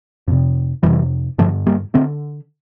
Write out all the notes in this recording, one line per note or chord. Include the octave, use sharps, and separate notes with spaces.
F2 C3
F2 C3 E3 G3
G2 D3 F3 A3
G3 A#3
D3 A3 C4